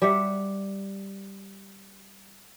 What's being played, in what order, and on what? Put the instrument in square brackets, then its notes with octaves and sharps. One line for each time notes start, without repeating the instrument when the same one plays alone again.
[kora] G3 G4 E5 F#5